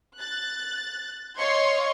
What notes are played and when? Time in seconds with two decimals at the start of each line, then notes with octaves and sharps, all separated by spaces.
0.17 F#6 A6
1.37 C#5 D#5 F5 C6 C#6 G#6